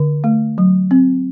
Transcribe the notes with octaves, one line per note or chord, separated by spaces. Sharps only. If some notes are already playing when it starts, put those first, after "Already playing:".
Already playing: D3
A3
F#3
C4